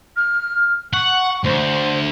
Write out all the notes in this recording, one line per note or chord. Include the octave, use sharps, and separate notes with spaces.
F6
F#5 C#6
D2 C5